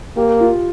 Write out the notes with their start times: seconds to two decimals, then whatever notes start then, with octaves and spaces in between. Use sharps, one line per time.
0.16 A#3 G4
0.41 F4